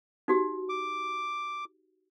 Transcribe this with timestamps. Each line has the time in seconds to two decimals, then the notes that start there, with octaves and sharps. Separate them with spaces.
0.28 D#4 F#4 G4
0.69 D6